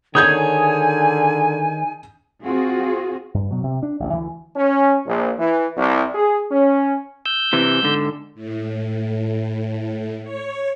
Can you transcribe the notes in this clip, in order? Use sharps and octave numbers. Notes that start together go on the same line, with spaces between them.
D3 D#3 G#4 C#5 G#5 D#6 G6 G#6
C4 F4 F#4 G#4
G2
B2 F#3
C3
D4
A1 D2
D2 E3
C#4
A#1
E3
C2
G#4
C#4
E6 G6
C3 E3
G#2 D3
A2
C#5